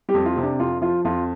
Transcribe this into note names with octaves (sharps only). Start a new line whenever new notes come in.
G3 G4
F2
F4
C3
D4
F2 F4
F3 F4
F2 F4